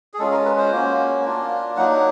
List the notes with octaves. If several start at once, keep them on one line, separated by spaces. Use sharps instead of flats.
G#4
G#3 C#4 F4 A4
A#4
B4
C5
A#3 C#4 F#4
A#3 D4 F4
F#3 A#3 D#4 F#5